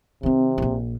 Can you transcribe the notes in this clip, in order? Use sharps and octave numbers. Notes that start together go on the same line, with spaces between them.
C3 D#3 C4
D1 A#1